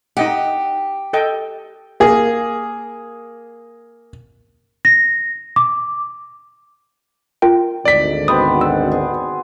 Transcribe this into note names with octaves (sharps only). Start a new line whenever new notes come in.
D#4 G4 D#5 F#5
A4 D#5 G5
A#3 G#4
A#6
D6
F4 A#4 G5
G#1 D2 D5 B6
B2 B3 C4 D#6
F#5 E6
G#4